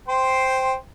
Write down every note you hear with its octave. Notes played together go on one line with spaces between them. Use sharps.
C5 G5 C6